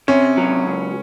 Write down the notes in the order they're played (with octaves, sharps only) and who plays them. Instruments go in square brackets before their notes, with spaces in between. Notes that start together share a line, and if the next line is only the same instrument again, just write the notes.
[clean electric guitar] C3 [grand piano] C#4
[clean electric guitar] F#3
C#2